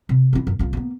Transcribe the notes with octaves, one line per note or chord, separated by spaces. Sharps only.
C3
C4 E4
F#2
C2 F4
A#3 B3